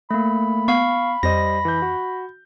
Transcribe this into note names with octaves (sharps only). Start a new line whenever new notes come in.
A3 A#3 B5
B3 F5 C#6
F2 G3 C5 D#5 A#6
E3 G6
F#4